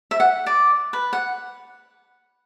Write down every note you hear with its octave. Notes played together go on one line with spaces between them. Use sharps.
E5
F#5
D5
B4
F#5